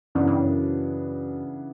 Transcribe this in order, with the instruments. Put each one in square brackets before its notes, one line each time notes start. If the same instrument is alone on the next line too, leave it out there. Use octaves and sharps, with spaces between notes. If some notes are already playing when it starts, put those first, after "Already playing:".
[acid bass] F#2 [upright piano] C#3 E3 B3 D4
[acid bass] G2
F#2